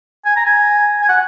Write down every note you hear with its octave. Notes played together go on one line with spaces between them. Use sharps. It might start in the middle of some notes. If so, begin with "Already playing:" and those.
G#5
A#5
G#5
G#5
F#5